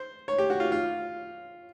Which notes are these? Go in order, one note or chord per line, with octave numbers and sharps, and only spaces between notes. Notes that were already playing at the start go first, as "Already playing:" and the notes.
Already playing: C5
C#5
G4
F#4
F4
F4